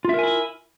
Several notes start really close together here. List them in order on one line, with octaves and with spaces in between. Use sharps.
F4 E5 A#4 G#5 E4